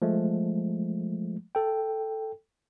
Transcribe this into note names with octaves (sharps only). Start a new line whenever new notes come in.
F3 G#3 A3
A4 G5